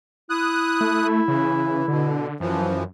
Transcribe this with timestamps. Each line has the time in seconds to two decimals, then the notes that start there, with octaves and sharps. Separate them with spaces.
0.30 E4 D#6 F#6
0.81 A3
1.28 C#3 E3
1.88 B2 D3
2.40 F#2 E3 F3